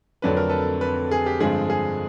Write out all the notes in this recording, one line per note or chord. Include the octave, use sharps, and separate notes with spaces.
F2 D3 F#3 A3 D4 B4
A#4
A4 B4
A4 B4
G#4
G4
G2 D3 F3 G#3 C4 G#4
G#4